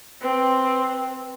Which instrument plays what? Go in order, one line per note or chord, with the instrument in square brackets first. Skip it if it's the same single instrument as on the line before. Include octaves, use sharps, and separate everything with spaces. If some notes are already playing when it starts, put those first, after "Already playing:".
[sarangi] C4 [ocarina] B4